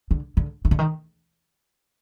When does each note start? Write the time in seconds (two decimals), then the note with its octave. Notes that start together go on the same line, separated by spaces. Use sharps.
0.11 D3
0.37 D3
0.65 D#3
0.71 D3
0.79 D#3